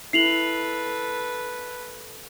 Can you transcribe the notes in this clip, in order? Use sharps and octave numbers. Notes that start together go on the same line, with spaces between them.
E4 A4 B4 C7 F7 F#7